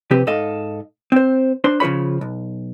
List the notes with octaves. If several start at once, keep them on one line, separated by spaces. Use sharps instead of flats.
C3 F3 C4 G4 B4
G#2 A4 D#5 F5
C4 C5
D4 C5 C6
C#3 F3 G#4 C#5 B5
B1